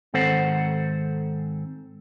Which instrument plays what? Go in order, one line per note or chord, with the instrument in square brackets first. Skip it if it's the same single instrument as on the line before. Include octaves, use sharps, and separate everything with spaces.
[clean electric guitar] G#2 D#3 C4 A4 C5 F#5